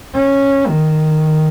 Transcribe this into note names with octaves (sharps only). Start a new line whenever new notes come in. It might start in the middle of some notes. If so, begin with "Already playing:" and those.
C#4
D#3